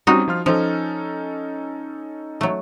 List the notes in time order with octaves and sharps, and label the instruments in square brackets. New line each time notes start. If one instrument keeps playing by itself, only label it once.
[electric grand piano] G3 C4 C#4 [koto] D#4 F#4
[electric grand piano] F3 F4 F6
[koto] F3 [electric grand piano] C#4 D#4 A4
[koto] F#3 A3